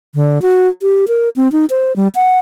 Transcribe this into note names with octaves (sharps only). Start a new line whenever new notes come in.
D3
F#4
G4
A#4
C4
D#4
C5
G3
F#5